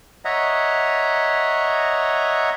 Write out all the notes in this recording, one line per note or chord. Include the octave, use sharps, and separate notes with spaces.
C#5 D#5 E5 F#5 A#5